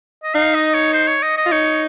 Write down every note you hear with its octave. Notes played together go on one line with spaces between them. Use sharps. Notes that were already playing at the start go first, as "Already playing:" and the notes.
D#5
D#4 F5
D#5
C#5
C5
C#5
D#5
D#5
F4
D#4 C#5